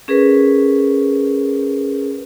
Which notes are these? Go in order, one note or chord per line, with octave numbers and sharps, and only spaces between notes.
C#4 G#4 A#4 B4